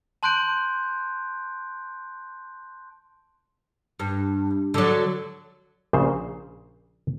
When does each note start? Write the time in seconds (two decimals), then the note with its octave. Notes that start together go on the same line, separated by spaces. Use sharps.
0.23 A5 C6 F#6 G6 D7
4.00 G2
4.74 D3 F#3
5.93 A#1 A#2 C#3 C5